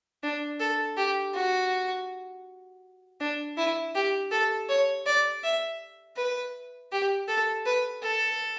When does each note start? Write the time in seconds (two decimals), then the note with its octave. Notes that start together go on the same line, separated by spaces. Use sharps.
0.23 D4
0.60 A4
0.97 G4
1.34 F#4
3.20 D4
3.57 E4
3.95 G4
4.31 A4
4.69 C#5
5.07 D5
5.44 E5
6.17 B4
6.92 G4
7.28 A4
7.66 B4
8.03 A4